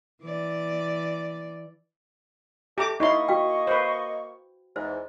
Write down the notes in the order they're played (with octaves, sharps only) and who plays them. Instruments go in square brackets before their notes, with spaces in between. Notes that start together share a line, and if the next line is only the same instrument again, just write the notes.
[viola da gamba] E3 D5
[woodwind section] A3 [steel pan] G4 A#5 D6 [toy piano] E5
[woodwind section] A#3 D#5 C#6 [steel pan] D#4 E4 C6
[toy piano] F#4 F5 G5
[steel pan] B4 C5
[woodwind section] E2 G#2 [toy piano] C5